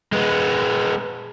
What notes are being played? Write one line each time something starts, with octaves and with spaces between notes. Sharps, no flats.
G#3 B3